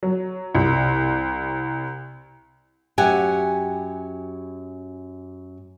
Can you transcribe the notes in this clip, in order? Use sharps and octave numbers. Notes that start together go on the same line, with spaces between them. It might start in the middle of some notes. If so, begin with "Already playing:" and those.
F#3
C2
F#2 G4 F#5 G#5